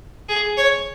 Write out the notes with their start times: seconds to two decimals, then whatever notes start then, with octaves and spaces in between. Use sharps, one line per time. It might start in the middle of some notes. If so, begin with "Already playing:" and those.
0.29 G#4
0.57 C#5